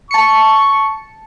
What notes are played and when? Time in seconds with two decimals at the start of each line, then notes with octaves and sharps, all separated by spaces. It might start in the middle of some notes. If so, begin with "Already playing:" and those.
0.11 A5 C#6 C#7